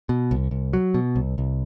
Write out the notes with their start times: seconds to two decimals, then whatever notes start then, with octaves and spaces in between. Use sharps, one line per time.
0.09 B2
0.31 C2
0.51 C2
0.73 F#3
0.94 B2
1.16 C2
1.38 C2